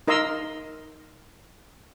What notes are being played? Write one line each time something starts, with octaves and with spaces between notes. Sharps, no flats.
D#4 A#4 D#5 F5 C6 E6